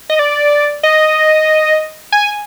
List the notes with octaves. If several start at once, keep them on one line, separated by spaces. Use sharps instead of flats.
D#5
D5
D#5
G#5